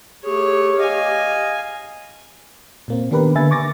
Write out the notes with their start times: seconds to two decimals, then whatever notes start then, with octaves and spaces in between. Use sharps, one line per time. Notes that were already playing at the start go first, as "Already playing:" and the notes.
0.24 A3 G4 G#4 C#5
0.79 D#5 F5 G#5
2.88 A#2 A#3 C4
3.11 D#3 B3 D4 G4 A#4 B4
3.35 D3 A#3 B4 E5 G#5 A6
3.51 C#6 D6 A6 A#6